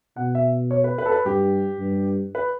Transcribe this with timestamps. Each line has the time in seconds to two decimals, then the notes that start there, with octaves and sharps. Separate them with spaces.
0.16 B2 F#5
0.35 E5
0.71 C#5
0.84 B4
0.98 B4
1.06 A4
1.12 B4
1.25 G2 G4
1.80 G2
2.35 B4